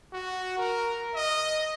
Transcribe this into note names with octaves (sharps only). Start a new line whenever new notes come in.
F#4
A#4
D#5